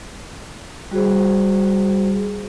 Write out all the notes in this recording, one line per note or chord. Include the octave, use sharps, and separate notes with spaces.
G3 F#4 G#4 C5